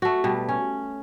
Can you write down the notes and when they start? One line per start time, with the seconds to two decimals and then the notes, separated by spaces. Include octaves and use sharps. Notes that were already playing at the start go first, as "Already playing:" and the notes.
0.02 A3 F#4
0.24 B2 G3
0.49 C#4